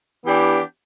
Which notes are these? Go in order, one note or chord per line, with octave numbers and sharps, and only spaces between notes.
E3 B3 D4 G4